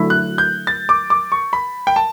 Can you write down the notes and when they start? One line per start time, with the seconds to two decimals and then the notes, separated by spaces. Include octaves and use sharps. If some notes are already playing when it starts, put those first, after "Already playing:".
Already playing: D3 F#3 A3 E4
0.10 F#6
0.38 G6
0.67 A6
0.89 D6
1.10 D6
1.32 C#6
1.53 B5
1.87 G5
1.96 A5